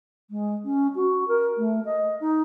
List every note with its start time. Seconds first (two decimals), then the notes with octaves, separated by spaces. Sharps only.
0.30 G#3
0.64 C#4
0.95 F#4
1.27 A#4
1.57 A3
1.85 D#5
2.20 D#4